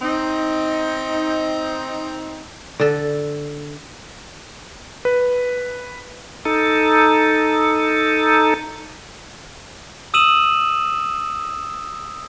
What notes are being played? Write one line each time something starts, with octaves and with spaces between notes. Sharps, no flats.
C4 D#4
D3 A4
B4
D#4 A4
D#6 E6 D#7 E7 F#7